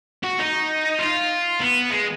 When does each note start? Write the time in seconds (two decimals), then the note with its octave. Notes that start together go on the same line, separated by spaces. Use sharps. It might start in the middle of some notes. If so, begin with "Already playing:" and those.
0.24 F#4
0.39 D#4
0.99 F4
1.60 B3
1.90 G#3